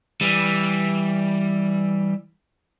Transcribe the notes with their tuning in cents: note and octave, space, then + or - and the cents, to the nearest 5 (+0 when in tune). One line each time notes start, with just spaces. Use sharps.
E3 -5 G3 +0